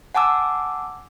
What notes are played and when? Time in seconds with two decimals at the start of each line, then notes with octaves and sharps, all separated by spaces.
0.15 F#5 G#5 A5 D6 E6